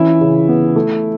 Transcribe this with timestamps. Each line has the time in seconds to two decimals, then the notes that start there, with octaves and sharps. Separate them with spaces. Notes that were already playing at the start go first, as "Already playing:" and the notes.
Already playing: E3 C#4 E4 E5
0.21 C#3
0.48 B3
0.76 A3